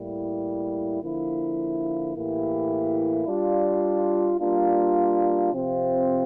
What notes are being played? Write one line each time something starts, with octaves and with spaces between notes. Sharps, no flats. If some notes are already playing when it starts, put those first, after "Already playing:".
Already playing: A2 G3 A#3 E4
D3 F3 A#3 E4
A2 E3 A#3 E4 G4
G3 D4 F4
G3 A#3 D4 F4
C3 F3 C4 F4